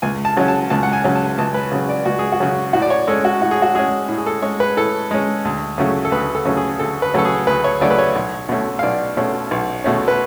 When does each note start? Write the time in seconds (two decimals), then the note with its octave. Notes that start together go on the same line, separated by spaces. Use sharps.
0.02 C#2 G#5
0.25 A5
0.37 C#3 F#3 C#4
0.48 A5
0.70 C#2 A5
0.83 F#5
0.93 G#5
1.04 C#3 F#3 C#4
1.15 A5
1.38 C#2 A5
1.54 B4
1.72 C#3 F#3 C#4
1.89 D5
2.05 C#2 F#4
2.19 G#4
2.32 F#4
2.40 C#3 F#3 C#4
2.73 A2 F#4
2.82 D5
2.90 C#5
3.07 G#3 A4
3.10 C#4
3.25 F#4
3.41 A2 F#4
3.51 G#4
3.62 F#4
3.75 G#3 C#4 G#4
4.08 A2
4.18 G#4
4.27 A4
4.42 G#3 C#4 C#5
4.60 B4
4.77 A2 A4
5.11 G#3 C#4
5.45 D2
5.78 C#3 F#3 A3 C#4
6.05 A4
6.12 D2 B4
6.35 A4
6.45 C#3 F#3 A3 C#4
6.57 G#4
6.79 D2 A4
7.02 B4
7.14 C#3 F#3 A3 C#4 A4
7.25 G#4
7.47 D2 B4
7.64 C#5
7.81 C#3 F#3 A3 C#4 D5
7.91 B4
7.99 C#5
8.16 B1
8.49 B2 A3 C#4
8.79 F5
8.83 B1 D5
9.17 B2 A3 C#4
9.51 B1
9.84 B2 A3 C#4
10.08 B4